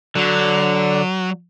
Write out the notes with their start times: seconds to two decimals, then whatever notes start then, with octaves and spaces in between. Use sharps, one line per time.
0.15 D3 F#3